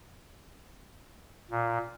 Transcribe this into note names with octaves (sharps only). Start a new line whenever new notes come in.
A#2